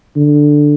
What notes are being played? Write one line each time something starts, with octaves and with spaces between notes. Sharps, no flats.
D3